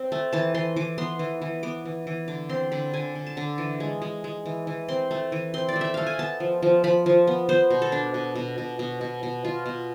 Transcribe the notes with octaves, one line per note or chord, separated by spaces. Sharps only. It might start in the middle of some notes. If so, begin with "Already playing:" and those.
Already playing: C4
A3
E3 A5
E3 C6
E3 D6
B3 C6
E3
E3
B3 D6
E3
E3
D3 D6
C4 C6
D3 B5
D3 G#5
D3
A5
D3
E3
G#3
G#3
G#3
E3
E3
C4 C6
A3
E3
C4 C6
D5
A3
E5
A3 F5
G#5
B3 A5
F3
F3
F3 B5
F3
B3
B3 C5
B2
A4
D4
B2
B2
B2
B2
B2
B2
B2 F4
B2